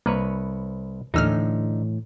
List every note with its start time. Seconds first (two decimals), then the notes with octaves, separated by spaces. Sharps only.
0.06 C2 A#3 B4 C#5
1.14 D#2 A2 D3 E3 D#4 E6 F6